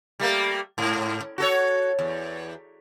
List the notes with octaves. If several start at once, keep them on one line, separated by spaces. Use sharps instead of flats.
G3 A3 A#3
G#2
F#4 A4 C#5
E2